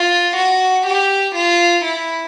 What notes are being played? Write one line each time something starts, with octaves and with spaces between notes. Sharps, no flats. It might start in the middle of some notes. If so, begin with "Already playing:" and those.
Already playing: F4
F#4
G4
F4
E4